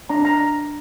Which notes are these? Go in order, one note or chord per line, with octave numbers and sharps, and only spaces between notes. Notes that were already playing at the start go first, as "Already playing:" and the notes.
D4 A#5
A#5